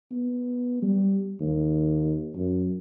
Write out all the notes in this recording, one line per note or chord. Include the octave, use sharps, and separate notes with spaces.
B3
G3
D#2
F#2